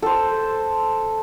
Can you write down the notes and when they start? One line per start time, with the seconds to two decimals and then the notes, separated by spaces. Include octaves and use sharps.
0.02 A4 C5